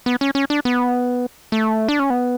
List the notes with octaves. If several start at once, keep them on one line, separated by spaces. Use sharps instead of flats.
B3
C#4
C#4
D4
B3
A3
D4
C#4
B3